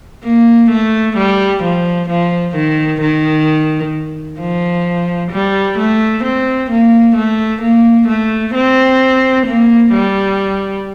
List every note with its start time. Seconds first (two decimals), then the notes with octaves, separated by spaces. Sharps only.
0.24 A#3
0.70 A3
1.17 G3
1.63 F3
2.09 F3
2.55 D#3
3.01 D#3
4.40 F3
5.32 G3
5.78 A3
6.24 C4
6.70 A#3
7.16 A3
7.62 A#3
8.08 A3
8.54 C4
9.46 A#3
9.93 G3